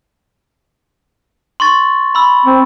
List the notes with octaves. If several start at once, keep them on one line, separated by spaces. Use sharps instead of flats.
C6 C#6 A6
B5 C6 E6
C4